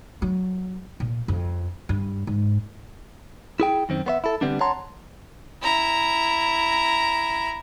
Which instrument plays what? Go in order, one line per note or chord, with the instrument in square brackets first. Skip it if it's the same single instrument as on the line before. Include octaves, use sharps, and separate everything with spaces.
[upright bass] F#3
A#2
F2
G2
G#2
[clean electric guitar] E4 G#4 G5
F#2 D#3 C4
B3 C5 E5
E4 A4
D3 G3 B3 C4 D4
C#5 F#5 A5 A#5 C6
[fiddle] E4 A#5